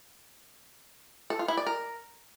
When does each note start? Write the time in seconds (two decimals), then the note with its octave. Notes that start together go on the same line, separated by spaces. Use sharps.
1.30 A4
1.39 F4
1.48 E4
1.57 D5
1.66 A#4